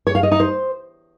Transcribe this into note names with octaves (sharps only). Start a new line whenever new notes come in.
C#5
F5
D#5
D#4
C5